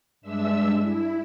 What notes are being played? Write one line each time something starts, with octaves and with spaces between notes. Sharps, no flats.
G2 G#3 D4 E5 E6
E4